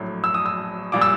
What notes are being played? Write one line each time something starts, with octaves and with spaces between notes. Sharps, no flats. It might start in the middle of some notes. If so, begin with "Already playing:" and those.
Already playing: A#1 A2 F#3
E6
D#6
E6
A#2 G3 D6
E6